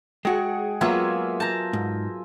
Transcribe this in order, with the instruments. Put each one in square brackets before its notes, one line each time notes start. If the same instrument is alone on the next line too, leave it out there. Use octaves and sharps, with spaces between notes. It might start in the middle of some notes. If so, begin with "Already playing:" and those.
[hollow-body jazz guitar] G#3 F#4 [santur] G#4 [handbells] F#5 G5
[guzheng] F#3 A#3 B3 [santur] F4 E5 G#5
[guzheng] A5 A#5 [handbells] G6 A#6
[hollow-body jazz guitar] G#2